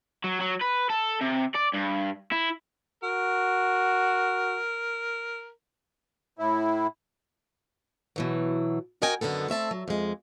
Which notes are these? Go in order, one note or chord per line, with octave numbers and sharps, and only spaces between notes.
F#3
F#3
B4
A4
C3
D5
G2
E4
F#4 A#4
A2 E4
B2 E3 F#3
F#4 A#4 D#5 G5 G#5
F#2 D3 D#3 B3 A4
A3 C4 E5 A5
F#3
F2 G#3